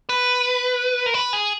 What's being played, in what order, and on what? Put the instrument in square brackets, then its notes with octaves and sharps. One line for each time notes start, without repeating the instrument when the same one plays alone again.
[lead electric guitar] B4
A#4
B4
G#4